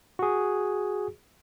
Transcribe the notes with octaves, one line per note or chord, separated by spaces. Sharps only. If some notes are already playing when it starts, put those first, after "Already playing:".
F#4 G#4